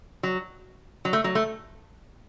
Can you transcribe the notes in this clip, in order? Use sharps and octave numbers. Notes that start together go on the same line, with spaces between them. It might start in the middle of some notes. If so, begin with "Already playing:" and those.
F#3
F#3
A3
F#3
A3